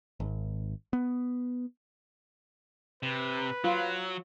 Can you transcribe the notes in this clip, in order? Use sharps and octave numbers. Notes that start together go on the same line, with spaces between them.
G#1
B3
C3 B4
F#3 F4